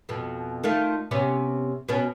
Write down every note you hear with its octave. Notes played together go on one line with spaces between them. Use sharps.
F2 B2
D#3 A3 F4
C3 B3 C#4
B2 B3 C#4